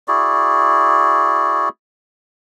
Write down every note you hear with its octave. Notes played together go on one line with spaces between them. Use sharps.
E4 F#4 G#4 D5